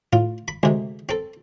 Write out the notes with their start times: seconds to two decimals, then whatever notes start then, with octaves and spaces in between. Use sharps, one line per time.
0.13 A2 F4
0.48 B5
0.63 D2 C3 G#3
1.09 C4 A4